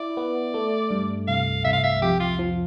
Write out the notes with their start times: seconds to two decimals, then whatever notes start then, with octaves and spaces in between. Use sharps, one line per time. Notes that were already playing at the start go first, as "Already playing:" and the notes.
Already playing: E4 D5
0.17 B3
0.54 A3
0.91 G2
1.28 C2 F5
1.65 C2 E5
1.73 F5
1.84 E5
2.02 F2 G4
2.20 F4
2.39 F3